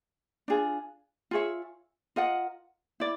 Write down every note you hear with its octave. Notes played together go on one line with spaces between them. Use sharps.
D4 F4 G#4
F4 G#4 C#5 E5
F4 A#4 D#5 F#5
E4 D5